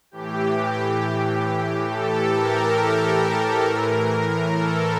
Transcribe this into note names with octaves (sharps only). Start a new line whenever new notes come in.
A2 E3 G4
A4
A#4
A2 E3
A4